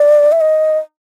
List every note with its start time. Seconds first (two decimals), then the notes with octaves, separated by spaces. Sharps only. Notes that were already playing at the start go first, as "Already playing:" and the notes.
Already playing: D5
0.32 E5
0.41 D#5